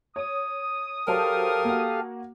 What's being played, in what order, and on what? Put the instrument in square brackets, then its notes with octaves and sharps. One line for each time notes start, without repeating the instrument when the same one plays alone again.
[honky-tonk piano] C#5 [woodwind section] D#6
[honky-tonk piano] F#3 C5 A5 [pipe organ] G4 A4 F5 [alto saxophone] A#4
[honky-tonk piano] A#3 F#4